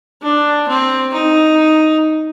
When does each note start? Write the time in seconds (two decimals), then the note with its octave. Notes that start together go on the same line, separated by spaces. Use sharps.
0.22 D4
0.68 C4
1.13 D#4